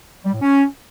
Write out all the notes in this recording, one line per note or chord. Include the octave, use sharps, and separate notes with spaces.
G3
A2
C#4